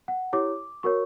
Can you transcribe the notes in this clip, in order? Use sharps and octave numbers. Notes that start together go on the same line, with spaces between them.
F#5
E4 G4 C#5 D6
F#4 A#4 C#5 C#6